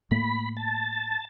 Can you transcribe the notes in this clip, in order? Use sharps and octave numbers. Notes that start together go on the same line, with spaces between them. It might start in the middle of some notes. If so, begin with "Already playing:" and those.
A2 A3 A#3 B5
A5